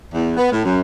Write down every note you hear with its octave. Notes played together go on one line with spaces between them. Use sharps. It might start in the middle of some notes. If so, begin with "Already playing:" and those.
E2
B3
A2
F#2